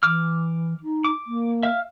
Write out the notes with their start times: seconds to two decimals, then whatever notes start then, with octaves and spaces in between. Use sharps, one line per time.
0.03 E3 D6 F6
0.83 D#4
1.04 D6
1.27 A#3
1.63 E5 F5